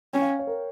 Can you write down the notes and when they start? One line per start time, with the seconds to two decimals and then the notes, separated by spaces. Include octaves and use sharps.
0.13 C#4 G5
0.22 F5
0.39 C#5
0.47 A#4